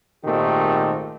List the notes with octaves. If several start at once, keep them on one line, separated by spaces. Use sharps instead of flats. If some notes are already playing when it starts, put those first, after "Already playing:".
G#1 A#2 D#3 A3 C4 G4